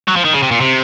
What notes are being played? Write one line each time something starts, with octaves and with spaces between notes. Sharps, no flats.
F#3
F3
D#3
C#3
C3
A#2
C3